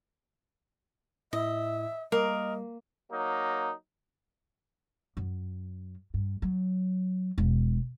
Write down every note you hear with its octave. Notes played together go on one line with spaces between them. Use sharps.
A2 E4 D#5 E5
G3 A#3 A#4 D#5
F#3 A#3 D#4
F#2
G2
F#3
E1